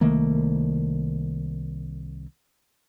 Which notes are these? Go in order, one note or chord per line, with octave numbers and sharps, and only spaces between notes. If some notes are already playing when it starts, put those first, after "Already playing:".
C2 D#3 A3 A#3